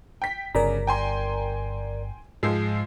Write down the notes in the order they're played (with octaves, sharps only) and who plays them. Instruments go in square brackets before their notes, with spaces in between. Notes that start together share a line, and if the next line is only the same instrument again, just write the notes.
[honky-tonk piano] G5 B6
[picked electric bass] G1 [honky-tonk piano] C#3 [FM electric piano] A#4 D5 A#5
[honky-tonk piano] G5 G#5 C6
[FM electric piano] G#2 E6 C7 [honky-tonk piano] F3 G#3